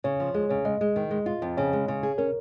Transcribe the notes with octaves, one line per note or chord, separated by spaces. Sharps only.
C#3 C#5
F3
G#3 G#4
C#3 C#5
G#3 D#5
G#3
D#3
G#3
F4
F2
C#3 C#5
G#3
C#3
G#4
C#4 A#4